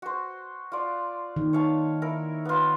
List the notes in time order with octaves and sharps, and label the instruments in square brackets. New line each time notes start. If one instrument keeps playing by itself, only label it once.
[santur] F#4 C5
F4 D5
[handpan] D#3
[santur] C#5 F5 A5
E4 A#4
B3 F4